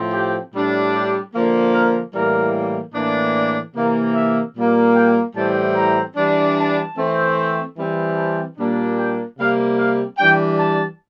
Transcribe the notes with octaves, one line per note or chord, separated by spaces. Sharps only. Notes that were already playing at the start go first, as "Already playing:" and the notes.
Already playing: A2 F3 C4
G4
A2 G3 D4
G4
D3 F3 A#3
A#4
A2 E3 G3 A#3 A#4
A2 E3 A#3 D4
D5
C3 E3 A#3
E5
A#2 G3 A#3
G5
A2 E3 G3 C4 A5
A#5
E3 G3 D4
A5
E3 A3 C4
E3 G3 C4
A5
A#2 G3 A#3 D4
G5
C3 G3 A#3 F5
F5
E3 G3 D4 G5
A5